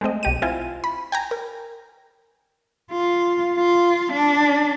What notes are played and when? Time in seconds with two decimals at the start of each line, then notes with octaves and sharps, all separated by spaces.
0.01 G#3 A3 C4 D#5
0.23 B1 G4 D#7
0.42 C4 E4 F4 G#5
0.84 B5
1.12 G5 G#5 A#5
1.31 A#4
2.91 F4
3.56 F4
4.13 D4